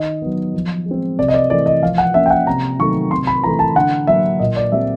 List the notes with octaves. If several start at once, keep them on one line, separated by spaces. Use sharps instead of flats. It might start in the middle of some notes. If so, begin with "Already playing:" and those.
Already playing: D#3 D#5
F#3 B3
F3
G#3
C4
C3 D5
D#5
D5
E3 A3 D5
D#5
F3 F5
F#5
A#3 C#4 E5
G5
F#5
C3 A#5
D#3 F#3 A3 C#6
C3 C6
B5
E3 A3 A#5
A5
D3 F#5
F#3 A#3 D4 E5
A#2 D#5
D5
G3 C4 E5